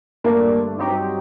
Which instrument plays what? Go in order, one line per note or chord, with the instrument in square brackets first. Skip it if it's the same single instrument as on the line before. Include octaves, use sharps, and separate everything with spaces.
[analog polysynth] G2 D3 A3 D4 [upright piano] A#3
[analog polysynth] G2 F#3 C4 D#4 G4